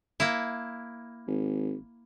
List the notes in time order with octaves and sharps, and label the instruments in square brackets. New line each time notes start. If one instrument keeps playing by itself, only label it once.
[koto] A#3 E4
[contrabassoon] G#1